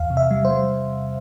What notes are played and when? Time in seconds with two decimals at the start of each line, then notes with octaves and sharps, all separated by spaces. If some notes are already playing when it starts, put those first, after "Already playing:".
Already playing: E2 F5
0.10 C3
0.17 E5
0.31 G3
0.45 C5
0.51 G3